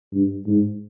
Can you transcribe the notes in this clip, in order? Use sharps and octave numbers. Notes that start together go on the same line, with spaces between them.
G2
G#2